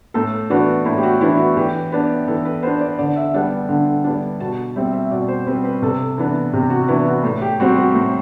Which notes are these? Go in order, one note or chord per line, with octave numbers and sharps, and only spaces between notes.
A2 A4
E3 B3 D4 F#4
A2 E4
G4
F#4
E3 B3 D4 E4
F#4
E3 G4
B3 D4
E3 A4
B4
B3 D4 C5
D5
D3 D5
E5
G3 B3 D4 F#5
D3
G3 B3 D4
B2 A5
G3 C4 E5
E5
B2 D5
C5
G3 C4 B4
B4
C3 A4
E3 B3 D4
C3 G4
F#4
F#4
E3 B3 D4 E4
F#4
A2 A4
G4
G3 C4 F#4
F#4
A2